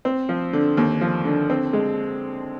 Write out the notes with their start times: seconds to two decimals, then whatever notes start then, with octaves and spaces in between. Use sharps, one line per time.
0.05 C4
0.29 F3
0.53 D3
0.77 D#2
1.01 F3
1.25 D3
1.50 C4
1.73 G#3